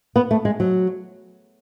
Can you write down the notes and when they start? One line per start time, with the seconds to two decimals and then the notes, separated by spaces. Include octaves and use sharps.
0.16 B3
0.31 A3
0.45 G#3
0.60 F#3